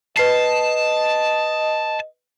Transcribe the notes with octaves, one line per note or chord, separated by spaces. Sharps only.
B4 D#5 A5 C7